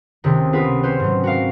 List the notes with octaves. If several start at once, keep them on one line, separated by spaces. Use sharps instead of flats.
C#2 C3 D#3
B3 F4 G#4 A#4 B4
C4 C#4 B4 C5
G#2 F#3
F#4 A#4 F5